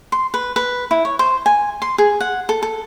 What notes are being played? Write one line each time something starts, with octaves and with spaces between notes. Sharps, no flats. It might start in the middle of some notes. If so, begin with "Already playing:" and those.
C6
B4
B4
E4
C#5
C5
G#5
C6
G#4
F#5
A4
A4